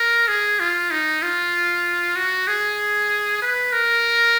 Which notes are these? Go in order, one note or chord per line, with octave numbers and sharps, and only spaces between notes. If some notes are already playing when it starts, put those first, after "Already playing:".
Already playing: A#4
G#4
F4
D#4
F4
F#4
G#4
B4
A#4